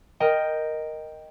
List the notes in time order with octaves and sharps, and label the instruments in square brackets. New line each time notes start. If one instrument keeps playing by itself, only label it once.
[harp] A#4 D#5 G5